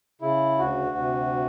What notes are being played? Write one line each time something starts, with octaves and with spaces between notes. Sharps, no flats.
C#3 E4
D2 F#4
C3